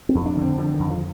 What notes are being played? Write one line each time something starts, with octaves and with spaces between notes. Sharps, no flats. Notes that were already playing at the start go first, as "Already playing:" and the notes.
C4
F2
D4
D3
C4
D3 F3
D#3
F2
F3